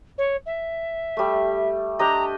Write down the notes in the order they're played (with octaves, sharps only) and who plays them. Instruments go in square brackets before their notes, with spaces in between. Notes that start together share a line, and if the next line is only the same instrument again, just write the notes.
[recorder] C#5
E5
[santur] G3 A3
[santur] D4 G4 D#5 [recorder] A#5